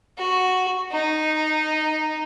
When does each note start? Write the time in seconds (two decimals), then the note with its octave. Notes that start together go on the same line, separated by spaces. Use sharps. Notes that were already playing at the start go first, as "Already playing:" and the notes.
0.18 F#4
0.92 D#4